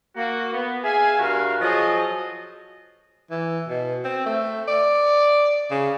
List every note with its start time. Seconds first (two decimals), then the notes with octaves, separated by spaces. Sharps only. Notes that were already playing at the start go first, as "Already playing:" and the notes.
0.16 A#3 F#4
0.52 B3
0.83 G#4 E5 F5 G#5
1.18 G2 F#4 A#4 F5
1.61 F3 F#3 G#4 A4 D#5
3.31 E3
3.69 B2
4.04 C4
4.26 A3
4.68 D5
5.71 C#3